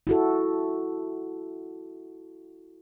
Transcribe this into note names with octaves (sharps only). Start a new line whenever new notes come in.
E4 F#4 A4